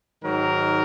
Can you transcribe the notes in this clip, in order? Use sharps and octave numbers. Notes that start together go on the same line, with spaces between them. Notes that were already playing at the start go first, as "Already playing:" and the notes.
G#2 D#3 F#3 A#4